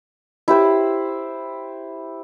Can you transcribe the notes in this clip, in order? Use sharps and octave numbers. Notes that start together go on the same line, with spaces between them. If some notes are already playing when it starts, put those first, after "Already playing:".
E4 G4 C5